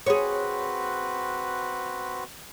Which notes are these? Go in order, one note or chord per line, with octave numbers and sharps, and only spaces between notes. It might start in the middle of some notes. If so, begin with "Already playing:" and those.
C4 F#4 G#4 B4 C#5